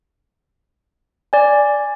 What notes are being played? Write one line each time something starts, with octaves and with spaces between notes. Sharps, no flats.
D5 G#5